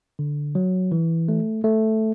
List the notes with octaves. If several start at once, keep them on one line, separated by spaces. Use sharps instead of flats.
D3
F#3
E3
A3
A3